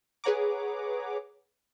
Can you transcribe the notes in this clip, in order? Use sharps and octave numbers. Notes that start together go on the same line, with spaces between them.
G#4 B4 C#5 F#5 A#5 D6